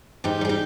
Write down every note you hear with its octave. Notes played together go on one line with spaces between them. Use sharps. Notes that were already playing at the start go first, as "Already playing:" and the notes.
G#2 D#4 G4
G3 G#4
D#4 G4